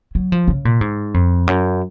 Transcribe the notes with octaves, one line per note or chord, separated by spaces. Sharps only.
F#3
F3
C#3
A#2
G#2
F2
F#2